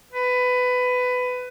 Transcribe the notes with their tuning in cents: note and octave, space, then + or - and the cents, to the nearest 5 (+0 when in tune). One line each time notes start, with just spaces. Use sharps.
B4 +15